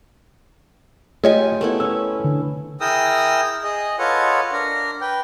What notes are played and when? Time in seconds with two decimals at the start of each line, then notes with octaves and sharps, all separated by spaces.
1.24 A3 F4 G4 G#4 C#5 D#5 G#5
1.61 A3 B3 E4 A#4
1.80 C#4 E6
2.24 D3
2.81 E4 G#4 A#4 G5 D#6 E6
3.64 G#4 D#5
3.99 F4 A4 B4 C#5 D#5 F#5
4.52 D4 A#4
5.01 B4 G5